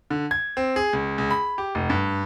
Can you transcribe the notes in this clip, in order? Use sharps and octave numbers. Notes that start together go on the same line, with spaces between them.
D3
G#6
C4
G#4
C#2
C#2
B5
G4
F1
G2